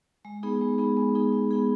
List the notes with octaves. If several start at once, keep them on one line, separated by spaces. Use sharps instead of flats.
G#3
B3 D#4 G#4
G#3
B3 D#4 G#4
G#3
B3 D#4 G#4
G#3
B3 D#4 G#4